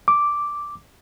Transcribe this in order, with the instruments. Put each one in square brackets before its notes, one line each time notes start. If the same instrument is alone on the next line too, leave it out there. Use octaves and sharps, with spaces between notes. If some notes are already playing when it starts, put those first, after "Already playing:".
[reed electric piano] D6